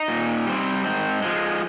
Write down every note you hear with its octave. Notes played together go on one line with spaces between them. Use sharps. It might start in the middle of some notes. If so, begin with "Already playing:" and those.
Already playing: D#4
A#2
G3 C4
G#2 C4
F3 G#3